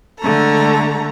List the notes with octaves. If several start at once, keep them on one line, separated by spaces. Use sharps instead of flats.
D3 G#3 A3 A4 A#5